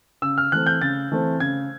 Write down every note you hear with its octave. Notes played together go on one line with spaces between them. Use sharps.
C#3 E6
F6
E3 A3 C4 F#6
G6
C#3 A6
E3 A3 C4
C#3 G#6